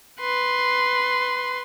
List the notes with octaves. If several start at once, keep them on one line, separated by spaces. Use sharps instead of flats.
B4 C6